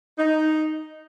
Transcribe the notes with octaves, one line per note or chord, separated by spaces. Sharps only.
D#4